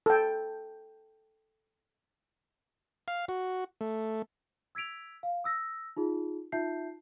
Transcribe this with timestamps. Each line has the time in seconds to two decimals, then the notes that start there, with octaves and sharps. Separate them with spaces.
0.06 A4 G5
3.08 F5
3.28 F#4
3.81 A3
4.75 E6 G#6 B6 D7 F7
5.23 F5
5.44 D#6 E6 A#6
5.97 D#4 F4 G#4
6.52 D#4 F4 E5 A5 G6 C7